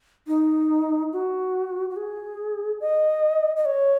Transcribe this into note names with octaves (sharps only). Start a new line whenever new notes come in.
D#4
F#4
F#4
G#4
D#5
D#5
C#5